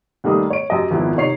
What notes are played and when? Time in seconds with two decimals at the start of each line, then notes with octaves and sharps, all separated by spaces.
0.24 D#2 D#3 G3 A3 A#4 D#6
0.50 C#5 D7
0.70 F#2 G4 D#5
0.91 G#1 F2 F3 B3 E4
1.16 C3 D#4 C#5 C7 F7